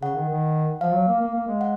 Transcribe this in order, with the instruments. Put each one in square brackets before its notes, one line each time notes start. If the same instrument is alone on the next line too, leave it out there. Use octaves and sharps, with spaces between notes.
[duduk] C#3 [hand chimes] F#5
[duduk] D#3
D#3
[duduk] F3 [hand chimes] F5
[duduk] F#3
A#3
A#3
A#3
G#3
[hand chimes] F#5